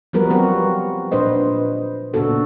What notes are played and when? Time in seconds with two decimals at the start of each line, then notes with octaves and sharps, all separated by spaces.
0.13 F3 G3 B3 F#4 A#4 B4
0.30 F#3 C4 F#4 G4
1.12 A#2 D4 B4 C5 D#5
2.14 A#2 C#3 B3 D4 F#4 A4